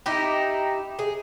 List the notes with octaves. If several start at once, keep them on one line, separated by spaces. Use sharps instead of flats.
D#4 E4 G4
G#4